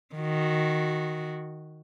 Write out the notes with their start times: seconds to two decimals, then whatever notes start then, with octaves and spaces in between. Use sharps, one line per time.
0.15 D#3 F#4